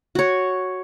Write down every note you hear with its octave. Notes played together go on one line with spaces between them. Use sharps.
F#4 C#5